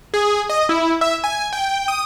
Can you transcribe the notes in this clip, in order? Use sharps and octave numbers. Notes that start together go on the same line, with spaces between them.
G#4
D#5
E4
E5
G#5
G5
D#6